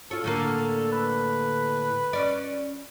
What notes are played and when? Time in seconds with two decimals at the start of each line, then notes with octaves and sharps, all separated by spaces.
0.11 F4 A4 C#5
0.24 A2 D3 A#3
0.92 B4
2.13 C#4 D5